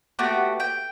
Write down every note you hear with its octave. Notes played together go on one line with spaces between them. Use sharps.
A3 B3 F#4 G4
G5